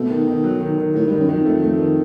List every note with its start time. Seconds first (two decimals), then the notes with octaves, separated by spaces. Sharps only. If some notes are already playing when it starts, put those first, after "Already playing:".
Already playing: B2 A3
0.10 D#3
0.27 D#3
0.44 F#3
0.61 D#3
0.78 D#3
0.94 A2 D#3
1.07 G2
1.11 D#3
1.20 F#2
1.29 F2 D#3
1.45 F2 A3
1.62 A3
1.79 D#3